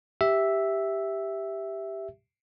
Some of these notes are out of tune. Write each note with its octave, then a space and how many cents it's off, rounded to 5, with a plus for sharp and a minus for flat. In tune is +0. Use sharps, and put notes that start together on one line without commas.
G4 +0 E5 +0